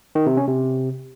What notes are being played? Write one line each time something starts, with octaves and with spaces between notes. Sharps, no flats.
D#3
C3
C#4
C3